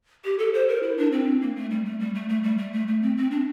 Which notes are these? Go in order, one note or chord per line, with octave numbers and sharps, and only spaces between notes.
G4
A4
C5
A#4
E4
D4
C4
A#3
A3
G3
A3
G3
A3
A3
G3
A3
A3
A3
C4
C4
D4